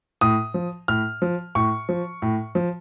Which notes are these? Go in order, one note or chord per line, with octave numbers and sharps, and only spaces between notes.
A2 D#6
F3
A2 F6
F3
A2 C#6
F3
A2
F3